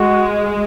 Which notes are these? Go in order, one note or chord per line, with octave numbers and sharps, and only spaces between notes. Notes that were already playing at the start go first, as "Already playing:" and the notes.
Already playing: G#3 F#4